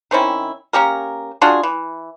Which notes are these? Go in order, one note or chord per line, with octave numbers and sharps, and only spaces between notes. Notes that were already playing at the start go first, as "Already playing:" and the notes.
D#3 C4 C#4 E4
A#3 C#4 G4 A#4
D4 F4 F#4 G#4
E3